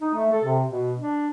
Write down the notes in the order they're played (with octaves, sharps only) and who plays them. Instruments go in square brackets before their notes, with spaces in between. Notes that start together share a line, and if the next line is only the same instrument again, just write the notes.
[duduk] D#4
A3
A4
C3
B2
D4